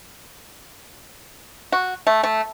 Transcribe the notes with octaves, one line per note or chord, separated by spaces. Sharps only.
F#4
A3
A3